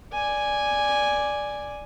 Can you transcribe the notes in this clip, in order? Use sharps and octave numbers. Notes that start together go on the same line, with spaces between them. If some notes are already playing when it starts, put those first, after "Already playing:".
D5 G#5